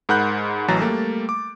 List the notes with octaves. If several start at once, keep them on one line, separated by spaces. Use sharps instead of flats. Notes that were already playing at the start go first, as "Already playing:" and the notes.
G#2 A#4 F#5 B5 F#6 G6
A1 E3 F#3 A#5 A6
G3 A3 A#3
D6